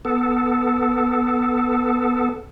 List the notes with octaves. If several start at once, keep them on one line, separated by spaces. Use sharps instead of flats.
B3 A4